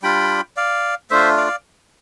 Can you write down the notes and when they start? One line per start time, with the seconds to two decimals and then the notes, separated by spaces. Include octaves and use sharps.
0.03 G3 D4 F4 G5 B5
0.57 D5 F5
1.10 A3 D4 F4 C5 E5
1.37 D5 F5
1.47 F5